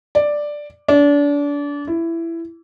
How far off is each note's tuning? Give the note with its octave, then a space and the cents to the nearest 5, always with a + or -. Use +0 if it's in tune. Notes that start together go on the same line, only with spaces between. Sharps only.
D5 +5
D4 -30
E4 +15